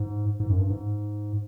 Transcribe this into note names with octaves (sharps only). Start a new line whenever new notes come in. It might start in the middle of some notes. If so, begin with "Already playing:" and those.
Already playing: G#2
G#2
F#2
G2
G#2